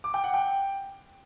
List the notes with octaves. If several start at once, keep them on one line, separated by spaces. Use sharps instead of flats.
D6
G5
F#5
G5